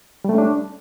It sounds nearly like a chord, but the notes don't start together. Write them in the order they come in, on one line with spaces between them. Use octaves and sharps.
G3 A3 C#4 D4